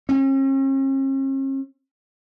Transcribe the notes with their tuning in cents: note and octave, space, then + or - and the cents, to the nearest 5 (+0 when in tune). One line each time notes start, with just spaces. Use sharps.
C#4 -45